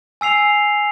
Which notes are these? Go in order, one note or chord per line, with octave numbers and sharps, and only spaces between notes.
G#5 E6 C7 F7